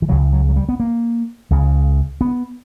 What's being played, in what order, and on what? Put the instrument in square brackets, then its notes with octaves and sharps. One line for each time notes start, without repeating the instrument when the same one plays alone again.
[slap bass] E3
C#2 C#3 F#3
F#3
F#3
G3
B3
A#3
C#2 C#3
B3